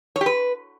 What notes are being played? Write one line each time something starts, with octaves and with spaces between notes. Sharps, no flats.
C#5
G4
B4